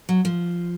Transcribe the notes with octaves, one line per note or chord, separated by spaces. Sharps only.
F#3
F3